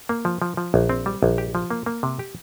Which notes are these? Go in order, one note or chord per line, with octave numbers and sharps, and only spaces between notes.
A#3
F3
F3
F3
A#1
C4
G3
A#1
G4
F3
A#3
A#3
C3
G4